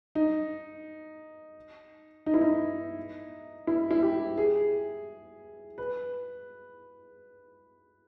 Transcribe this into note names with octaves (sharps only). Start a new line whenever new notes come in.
D#4
D#4
E4
D#4
E4
E4
G4
G#4
B4